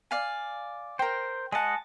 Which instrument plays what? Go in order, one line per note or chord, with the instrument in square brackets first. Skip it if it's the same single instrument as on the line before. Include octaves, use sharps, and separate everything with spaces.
[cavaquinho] D5 F5 G#5
[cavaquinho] A#4 G5 [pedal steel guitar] C5
[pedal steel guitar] G#3 D#5 F#5 [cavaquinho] G#5 A5